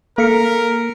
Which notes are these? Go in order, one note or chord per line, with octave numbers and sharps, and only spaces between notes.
A#3 A4 A#4 B6 C#7